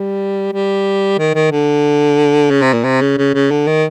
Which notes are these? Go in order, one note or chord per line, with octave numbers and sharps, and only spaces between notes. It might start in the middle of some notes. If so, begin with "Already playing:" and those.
Already playing: G3
G3
D#3
D#3
D3
C#3
C3
A#2
C3
C#3
C#3
C#3
D3
D#3